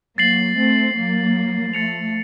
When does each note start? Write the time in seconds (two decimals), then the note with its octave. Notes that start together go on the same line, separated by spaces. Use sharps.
0.18 F#3 A#3 A6 C7 F#7
0.57 A3 C4
0.96 F#3 A#3
1.73 F3 A3 A6 C#7 F7